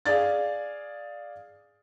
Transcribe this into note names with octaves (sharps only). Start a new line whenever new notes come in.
G#4 D5 F5 A6